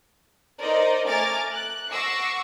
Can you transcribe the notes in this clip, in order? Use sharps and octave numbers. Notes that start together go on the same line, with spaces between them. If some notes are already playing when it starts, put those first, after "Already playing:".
D#4 A#4 C5 D5 D#5
A3 G#5 A#5 D6 F6 A6
F#6
F#5 C#6 D6 E6 A#6 C7